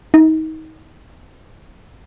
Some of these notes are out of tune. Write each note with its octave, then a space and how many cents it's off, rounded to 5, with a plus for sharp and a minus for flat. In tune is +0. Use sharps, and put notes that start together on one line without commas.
D#4 +25